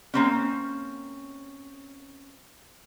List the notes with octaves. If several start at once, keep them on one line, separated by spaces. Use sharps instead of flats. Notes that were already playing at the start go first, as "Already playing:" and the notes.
A#3 C4 C#4